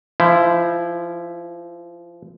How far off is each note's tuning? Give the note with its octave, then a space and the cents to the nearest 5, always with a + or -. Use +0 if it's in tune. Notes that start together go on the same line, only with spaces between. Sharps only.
F3 -25 E4 +0